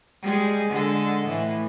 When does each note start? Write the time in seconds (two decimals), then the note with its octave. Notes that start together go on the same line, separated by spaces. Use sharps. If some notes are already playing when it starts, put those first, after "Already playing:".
0.22 G3 G#3 G#4
0.70 D3 G#3 A4
1.26 A2 E3